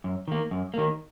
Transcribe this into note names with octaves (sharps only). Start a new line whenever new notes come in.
F#2
D#3 A#3
F#2
D#3 A#3